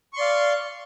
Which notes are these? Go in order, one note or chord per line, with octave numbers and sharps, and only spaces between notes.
D5 F5 C6 C#6